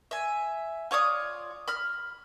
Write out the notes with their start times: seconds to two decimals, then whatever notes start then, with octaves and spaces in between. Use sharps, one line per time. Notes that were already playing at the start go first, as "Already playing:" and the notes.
0.11 E5 G#5
0.91 F4 C#5 D5 D#6
1.68 B5 F6